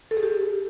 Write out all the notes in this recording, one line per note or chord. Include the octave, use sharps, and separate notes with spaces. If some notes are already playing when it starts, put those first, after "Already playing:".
A4
G#4
G4